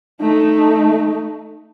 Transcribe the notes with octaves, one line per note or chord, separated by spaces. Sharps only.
A3 D#4